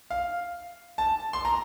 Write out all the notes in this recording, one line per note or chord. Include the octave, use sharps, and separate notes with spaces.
F5
A5
C6
A#5